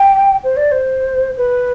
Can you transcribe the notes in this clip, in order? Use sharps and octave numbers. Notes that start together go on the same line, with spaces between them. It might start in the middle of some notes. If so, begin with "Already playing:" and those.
Already playing: G5
C5
D5
C5
B4